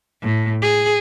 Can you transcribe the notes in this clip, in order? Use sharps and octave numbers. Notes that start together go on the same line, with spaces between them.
A2
G#4